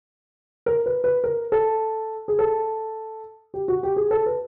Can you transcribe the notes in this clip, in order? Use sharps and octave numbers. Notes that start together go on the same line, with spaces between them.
A#4
B4
B4
A#4
A4
G#4
A4
G4
F#4
G4
G#4
A4
B4